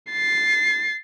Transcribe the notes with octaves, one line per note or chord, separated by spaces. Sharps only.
A6 C7